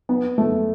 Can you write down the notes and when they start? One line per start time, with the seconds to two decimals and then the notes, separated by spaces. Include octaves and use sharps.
0.09 B3
0.38 A3